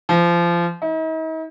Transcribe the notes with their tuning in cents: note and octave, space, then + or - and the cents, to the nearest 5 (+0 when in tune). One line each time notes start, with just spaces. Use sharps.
F3 -25
D#4 +45